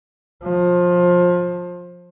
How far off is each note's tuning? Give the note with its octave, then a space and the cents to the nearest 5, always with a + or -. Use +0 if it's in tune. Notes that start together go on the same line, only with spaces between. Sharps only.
F3 +20